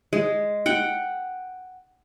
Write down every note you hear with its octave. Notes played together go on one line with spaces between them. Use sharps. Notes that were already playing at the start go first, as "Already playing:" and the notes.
G#3
F#5 G5